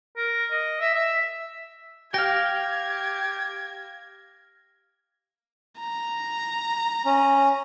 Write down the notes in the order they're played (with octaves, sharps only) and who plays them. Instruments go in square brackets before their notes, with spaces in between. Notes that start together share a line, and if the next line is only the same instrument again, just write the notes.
[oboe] A#4
D#5
E5
E5
[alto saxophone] G4 [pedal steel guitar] F5 G5 [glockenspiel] F6 A#6 [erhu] G#6
[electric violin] A#5
[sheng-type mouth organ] C#4